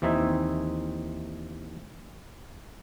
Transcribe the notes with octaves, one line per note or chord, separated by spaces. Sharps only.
D#2 E3 C4 D#4 E5 G#5